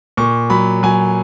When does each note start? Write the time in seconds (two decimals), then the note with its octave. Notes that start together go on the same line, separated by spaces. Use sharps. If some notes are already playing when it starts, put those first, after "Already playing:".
0.17 A#2 C#6
0.50 F#3 B5
0.83 F#3 G#5